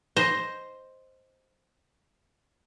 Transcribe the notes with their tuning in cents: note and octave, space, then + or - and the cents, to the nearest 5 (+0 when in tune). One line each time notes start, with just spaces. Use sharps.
C5 +0 D#5 +0